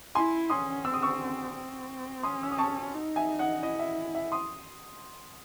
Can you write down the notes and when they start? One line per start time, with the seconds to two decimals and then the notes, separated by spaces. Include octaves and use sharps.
0.15 E4 G#5 C6
0.50 C#4 C6 D#6
0.85 C4 E6
0.94 D#6
1.02 C#6 E6
1.54 C4
2.23 C#4 C6 D#6
2.43 E6
2.51 D#6
2.58 A5 C#6
2.93 D#4
3.16 E5 G#5
3.39 D#5 F#5
3.63 E4 D#5
3.79 E5
4.15 E5
4.32 C6 D#6